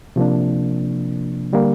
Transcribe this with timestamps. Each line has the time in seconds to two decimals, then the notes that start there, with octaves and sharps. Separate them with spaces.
0.16 C3 F3 A#3 D4
1.53 D3 G3 A#3